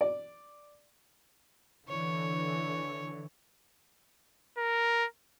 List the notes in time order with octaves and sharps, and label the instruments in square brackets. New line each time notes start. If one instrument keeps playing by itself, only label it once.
[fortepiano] D5
[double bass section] D3 E3 [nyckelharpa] C#5
[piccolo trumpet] A#4